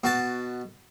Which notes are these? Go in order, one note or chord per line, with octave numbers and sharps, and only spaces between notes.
B2 F#4 A5